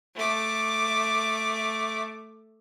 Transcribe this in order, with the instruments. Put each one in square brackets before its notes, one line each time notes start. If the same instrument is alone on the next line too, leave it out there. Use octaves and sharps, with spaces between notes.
[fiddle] A3 D6